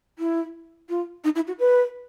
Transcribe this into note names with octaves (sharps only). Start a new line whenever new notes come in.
E4
F4
D#4
E4
F#4
B4